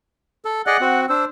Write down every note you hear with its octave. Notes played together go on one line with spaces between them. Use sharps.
A4
G#4 D5 D#5 F#5
C4 F#4
D4 C5 E6